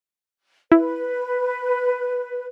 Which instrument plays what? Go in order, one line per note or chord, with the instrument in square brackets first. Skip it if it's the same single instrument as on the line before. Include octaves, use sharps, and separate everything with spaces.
[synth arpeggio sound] E4 [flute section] B4